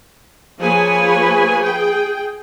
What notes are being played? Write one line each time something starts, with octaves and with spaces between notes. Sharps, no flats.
F3 A#3 G#4 B4 C#5 G#5
G#4 G5